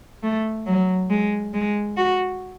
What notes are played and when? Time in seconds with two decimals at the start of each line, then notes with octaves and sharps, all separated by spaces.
0.23 A3
0.66 F#3
1.10 G#3
1.54 G#3
1.97 F#4